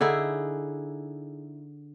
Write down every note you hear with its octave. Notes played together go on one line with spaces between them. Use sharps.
D3 D#4 E4 G#4